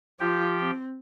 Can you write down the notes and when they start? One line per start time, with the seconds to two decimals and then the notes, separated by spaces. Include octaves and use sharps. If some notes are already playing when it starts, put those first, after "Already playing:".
0.20 F3 F4 G4 G5
0.60 C4